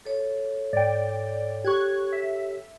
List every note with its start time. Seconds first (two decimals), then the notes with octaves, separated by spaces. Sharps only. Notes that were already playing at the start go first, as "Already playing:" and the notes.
0.05 A4 C#5
0.73 G#2 D5 G5
1.65 G4 C#6 F#6 G#6
2.12 E5